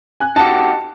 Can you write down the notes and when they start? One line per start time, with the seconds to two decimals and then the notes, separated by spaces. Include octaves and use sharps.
0.20 G#5 F#6
0.36 D#4 F#4 G4 A5